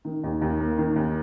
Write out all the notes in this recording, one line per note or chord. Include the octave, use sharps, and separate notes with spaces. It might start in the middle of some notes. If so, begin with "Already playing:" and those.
D#3
D#2
D#2
A#3
D#3
D#2